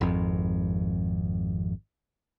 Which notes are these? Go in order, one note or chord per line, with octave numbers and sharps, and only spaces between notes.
G#1 F2